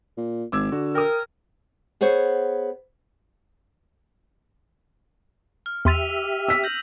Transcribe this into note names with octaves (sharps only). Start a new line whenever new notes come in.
A#2
G#1 D6 E6 G#6
D3 F#4
A#4 G5 D#6
B3 G#4 C5 C#5
F6
E2 G4 E5 C6 E6 A6 D#7 F7
E6 B6
G6 A#6 F#7